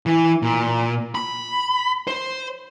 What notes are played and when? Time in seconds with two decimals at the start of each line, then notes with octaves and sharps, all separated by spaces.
0.06 E3
0.42 A#2
1.15 B5
2.08 C5